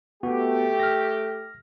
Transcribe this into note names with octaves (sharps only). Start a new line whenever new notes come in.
A3 B3 F#4 G4
F6 A#6